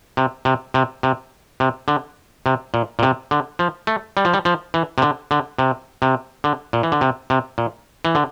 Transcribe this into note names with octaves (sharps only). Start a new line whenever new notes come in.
C3
C3
C3
C3
C3
D3
C3
A#2
A#2
C3
D3
F3
A3
G3
F3
G3
F3
E3
C3
D3
D3
C3
C3
D3
A#2
E3
D3
C3
C3
A#2
E3
D3